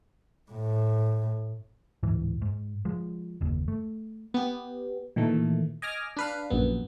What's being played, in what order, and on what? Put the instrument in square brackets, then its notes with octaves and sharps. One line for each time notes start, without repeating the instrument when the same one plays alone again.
[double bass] A2
[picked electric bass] D1 G#2 E3
G#2
F3 G#3
F#1 D#2
A3
[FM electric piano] B3 G4
A#2 D#3 E3 A3
D#5 G#5 D6 F6 A#6
D4 B4 F5
A#1 F#2 B3